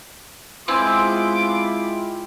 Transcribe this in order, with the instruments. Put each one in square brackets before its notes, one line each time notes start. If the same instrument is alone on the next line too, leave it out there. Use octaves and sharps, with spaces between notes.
[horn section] G#3 E4 F4 [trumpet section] B3 C6 D6 [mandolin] C4 G#5